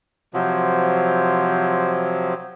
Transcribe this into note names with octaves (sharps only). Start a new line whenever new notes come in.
C3 F3 F#3